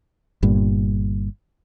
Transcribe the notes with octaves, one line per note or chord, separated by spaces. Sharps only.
G1 G2 A#2